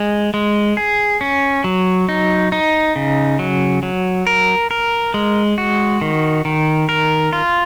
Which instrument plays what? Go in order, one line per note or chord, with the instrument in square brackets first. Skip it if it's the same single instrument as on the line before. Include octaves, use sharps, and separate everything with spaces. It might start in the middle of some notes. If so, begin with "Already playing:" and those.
Already playing: [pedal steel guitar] G#3
G#3
G#4
C#4
F#3
D#4
D#4
C#3
F#3
F#3
A#4
A#4
G#3
F#4
D#3
D#3
A#4
F4